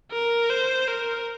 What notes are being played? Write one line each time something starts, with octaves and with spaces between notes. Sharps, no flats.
A#4
C5
A#4